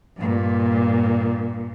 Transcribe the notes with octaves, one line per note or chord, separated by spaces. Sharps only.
G2 A#2